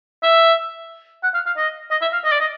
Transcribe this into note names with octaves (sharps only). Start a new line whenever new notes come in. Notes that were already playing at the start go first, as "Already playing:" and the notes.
E5
F#5
F5
F5
D#5
D#5
E5
F5
D#5
D5
D#5